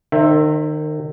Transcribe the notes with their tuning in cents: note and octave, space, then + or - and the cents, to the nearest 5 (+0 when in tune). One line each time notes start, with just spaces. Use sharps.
D#3 -30 C5 +20 E5 +5